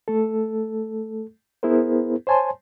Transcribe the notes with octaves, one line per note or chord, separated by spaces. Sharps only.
A3 A4
B3 E4 G#4 A#4 C5
C5 C#5 G#5 A5 C6